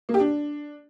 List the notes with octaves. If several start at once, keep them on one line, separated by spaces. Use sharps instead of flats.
A#3
G4
D4